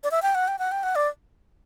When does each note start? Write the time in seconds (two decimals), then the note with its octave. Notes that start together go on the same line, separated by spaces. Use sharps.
0.04 D5
0.11 E5
0.22 G5
0.35 F#5
0.48 G5
0.59 F#5
0.72 G5
0.83 F#5
0.96 D5